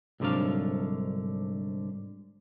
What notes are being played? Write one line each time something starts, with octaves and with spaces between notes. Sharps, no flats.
C2 G#2 D3 F#3 D4 F5